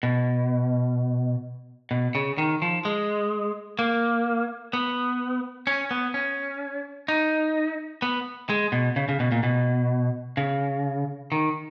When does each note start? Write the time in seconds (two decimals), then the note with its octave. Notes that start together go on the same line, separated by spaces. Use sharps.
0.03 B2
1.91 B2
2.15 C#3
2.38 D#3
2.62 F3
2.85 G#3
3.79 A#3
4.73 B3
5.67 C#4
5.91 B3
6.14 C#4
7.08 D#4
8.02 B3
8.50 G#3
8.72 B2
8.96 C#3
9.09 C#3
9.20 B2
9.32 A#2
9.43 B2
10.37 C#3
11.32 D#3